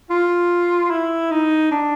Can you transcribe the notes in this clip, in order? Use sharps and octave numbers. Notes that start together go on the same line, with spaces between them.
F4
E4
D#4
D4